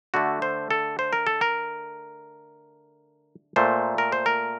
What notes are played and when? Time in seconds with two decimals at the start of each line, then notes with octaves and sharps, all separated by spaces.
0.14 D3 A3 F#4
0.42 C5
0.71 A4
0.99 C5
1.13 A#4
1.27 A4
1.41 A#4
3.56 A#2 A3 C5
3.98 A#4
4.12 C5
4.26 A#4